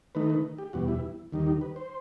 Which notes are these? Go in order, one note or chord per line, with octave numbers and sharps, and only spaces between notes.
D#3 A3 D#4 B4
B4
G4
E2 B2 G3 F#4
E4
D#2 D#3 G3 D#4
G4
B4
C5